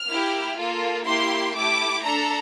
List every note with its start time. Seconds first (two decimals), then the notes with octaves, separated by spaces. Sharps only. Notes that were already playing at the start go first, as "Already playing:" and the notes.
Already playing: F6
0.08 A#3 E4 G4
0.57 A#3 F4 A4
1.07 A#3 E4 G4 C6
1.56 A3 E4 G4 D6
2.05 D4 A4 A#5